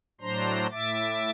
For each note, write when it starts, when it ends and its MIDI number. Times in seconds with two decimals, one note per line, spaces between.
0.21 0.67 45
0.21 0.67 54
0.21 0.67 62
0.21 0.67 72
0.21 0.67 82
0.21 0.67 84
0.72 1.30 45
0.72 1.30 76
0.72 1.30 86
0.72 1.30 93